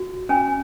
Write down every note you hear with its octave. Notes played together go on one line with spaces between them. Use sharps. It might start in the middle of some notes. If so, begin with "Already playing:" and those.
Already playing: F#4
C#4 G#5